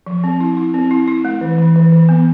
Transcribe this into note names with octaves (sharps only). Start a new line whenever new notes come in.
F3
C4
E4
E4
C4
E4
E4
A3
E3
E3
E3
E3
B3